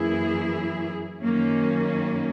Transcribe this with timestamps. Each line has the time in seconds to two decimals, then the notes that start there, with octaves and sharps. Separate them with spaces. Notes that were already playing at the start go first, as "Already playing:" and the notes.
Already playing: F#2 E3 A#3 E4 G#4
1.22 F#2 D#3 A#3 C#4